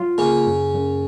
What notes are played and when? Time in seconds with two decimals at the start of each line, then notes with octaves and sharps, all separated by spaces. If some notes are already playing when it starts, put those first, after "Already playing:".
Already playing: F#3 F4
0.18 C#3 A#3 C#4
0.46 F#2
0.74 F#2